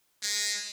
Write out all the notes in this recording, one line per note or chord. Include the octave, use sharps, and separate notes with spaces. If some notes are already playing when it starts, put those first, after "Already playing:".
G#3